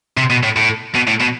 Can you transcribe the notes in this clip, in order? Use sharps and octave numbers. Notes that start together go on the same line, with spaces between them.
C3
B2
A2
A2
B2
A2
B2